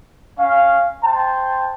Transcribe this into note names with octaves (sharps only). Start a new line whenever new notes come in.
C#4 F5
C5 G5 A5